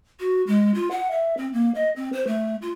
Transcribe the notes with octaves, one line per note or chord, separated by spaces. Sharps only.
F#4
G#3
F4
F#5
E5
C4
A#3
D#5
C4
C5
A3
F4